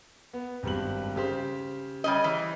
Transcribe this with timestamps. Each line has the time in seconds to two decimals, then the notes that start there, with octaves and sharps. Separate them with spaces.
0.33 B3
0.63 G#1 G2 F#7
1.16 C#3 G4 C5
2.04 G3 C#4 D#5
2.24 E3